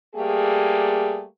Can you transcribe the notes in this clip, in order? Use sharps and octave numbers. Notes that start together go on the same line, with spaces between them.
G3 A3 A#3 G4 G#4